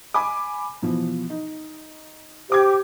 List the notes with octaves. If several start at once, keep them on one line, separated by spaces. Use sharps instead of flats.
G#5 B5 D6
B2 E3 F3
D#4
G4 C5 D6 G#6